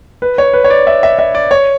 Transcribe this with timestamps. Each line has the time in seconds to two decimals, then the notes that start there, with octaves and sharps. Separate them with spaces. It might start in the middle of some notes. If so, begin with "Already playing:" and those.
0.22 B4
0.38 C#5
0.53 B4
0.64 C#5
0.70 D5
0.87 E5
1.03 E5
1.19 E5
1.35 D5
1.51 C#5